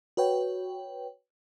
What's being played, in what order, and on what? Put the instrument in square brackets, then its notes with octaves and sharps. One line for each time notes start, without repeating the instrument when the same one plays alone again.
[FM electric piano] F#4 B4 C#5 G5